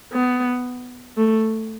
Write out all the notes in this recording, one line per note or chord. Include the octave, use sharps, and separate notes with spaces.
B3
A3